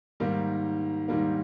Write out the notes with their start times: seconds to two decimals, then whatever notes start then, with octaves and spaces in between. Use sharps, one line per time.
0.20 G#2 D#3 G3 A#3
1.08 G#2 D#3 G3 A#3